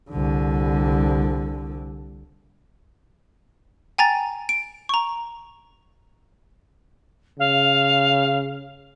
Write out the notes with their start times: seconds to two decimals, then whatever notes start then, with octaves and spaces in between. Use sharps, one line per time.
0.10 C2 D3
3.98 G5 G#5 A#5 A6
4.49 D7
4.89 A#5 C#6
7.39 C#3 F5